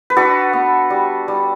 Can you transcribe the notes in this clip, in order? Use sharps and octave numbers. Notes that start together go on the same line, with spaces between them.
B4
D4 F#4 A4
B3
G3
G3